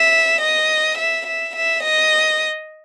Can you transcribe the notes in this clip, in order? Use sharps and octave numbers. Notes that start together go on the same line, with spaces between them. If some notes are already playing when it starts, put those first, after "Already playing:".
Already playing: E5
D#5
E5
E5
E5
D#5